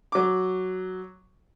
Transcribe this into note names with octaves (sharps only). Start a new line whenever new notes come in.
F#3 D6